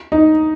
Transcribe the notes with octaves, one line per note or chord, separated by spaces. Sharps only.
D#4